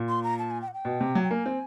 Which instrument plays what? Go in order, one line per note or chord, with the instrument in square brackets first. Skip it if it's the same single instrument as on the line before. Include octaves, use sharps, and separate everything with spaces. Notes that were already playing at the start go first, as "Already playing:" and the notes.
Already playing: [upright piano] A#2
[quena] C6
A#5
A5
G#5
G5
F#5
G5
[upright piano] B2
C3
F#3
[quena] G5
[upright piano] A#3 [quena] G#5
[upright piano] C4